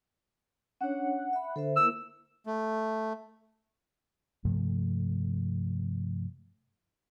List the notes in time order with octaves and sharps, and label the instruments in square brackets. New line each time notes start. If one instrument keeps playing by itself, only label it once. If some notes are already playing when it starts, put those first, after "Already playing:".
[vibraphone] C#4 D4 C#5 [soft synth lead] F#5
[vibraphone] E5 B5
[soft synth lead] D3 [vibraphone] A4 C5 E5
[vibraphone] A#3 E4 A#4 [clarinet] E6
[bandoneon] A3
[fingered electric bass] G2 C3 F3 A3